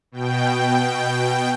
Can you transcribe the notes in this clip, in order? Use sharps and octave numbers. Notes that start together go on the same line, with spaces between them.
B2 G5